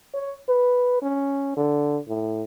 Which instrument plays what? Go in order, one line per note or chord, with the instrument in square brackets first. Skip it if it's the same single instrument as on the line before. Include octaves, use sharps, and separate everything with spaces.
[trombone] C#5
B4
C#4
D3
A2